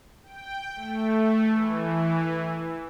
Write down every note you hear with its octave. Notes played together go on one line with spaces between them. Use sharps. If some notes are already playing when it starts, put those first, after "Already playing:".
G5
A3
E3